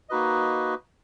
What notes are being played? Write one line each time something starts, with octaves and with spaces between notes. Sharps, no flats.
A#3 D#4 F#4 B4 D#5